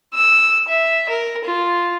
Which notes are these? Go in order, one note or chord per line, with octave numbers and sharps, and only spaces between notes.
E6
E5
A#4
F4